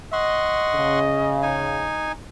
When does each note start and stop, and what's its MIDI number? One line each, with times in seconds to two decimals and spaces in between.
0.13 1.52 75
0.13 0.99 78
0.13 0.99 84
0.13 0.99 85
0.75 1.88 49
1.43 2.12 63
1.43 2.12 80